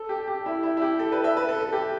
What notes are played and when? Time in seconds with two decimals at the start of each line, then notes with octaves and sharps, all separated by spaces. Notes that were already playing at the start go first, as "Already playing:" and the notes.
Already playing: A4
0.09 G4
0.28 G4
0.46 E4
0.63 E4
0.77 E4
0.82 G4
0.99 A4
1.12 B4
1.24 E5
1.37 B4
1.49 A4
1.61 A4
1.72 G4